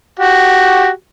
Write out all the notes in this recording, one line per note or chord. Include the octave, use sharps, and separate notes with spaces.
F#4 G4